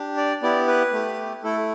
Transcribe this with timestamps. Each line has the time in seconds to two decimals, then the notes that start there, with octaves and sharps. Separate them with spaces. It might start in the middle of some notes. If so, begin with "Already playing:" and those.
Already playing: D4 G4
0.17 D5
0.42 B3 E4 G4 D5
0.67 B4
0.93 A3 G4
1.43 A3 E4 A4